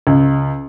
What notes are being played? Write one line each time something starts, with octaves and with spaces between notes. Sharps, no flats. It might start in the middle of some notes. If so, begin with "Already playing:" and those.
C#2